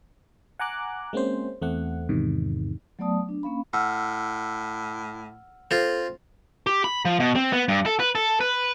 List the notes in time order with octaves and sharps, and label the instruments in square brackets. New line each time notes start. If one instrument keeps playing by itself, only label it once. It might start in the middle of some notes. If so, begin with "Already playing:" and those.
[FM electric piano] F#5 G#5 A#5 D6 F#6
G#3 A#3 C4 C#4 C5
E2 A3 C4 F#5
E2 G#2 C3 D#3
[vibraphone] F#3 A3 B3 D5 A5 D#6
D4
A#3 C#4 F5 B5
[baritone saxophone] A2 [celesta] F#5 E6 F6
[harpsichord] C4 F4 [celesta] A4
[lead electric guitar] G4
B5
F3
B2
C4
B3
G2
A4
B4
A4
B4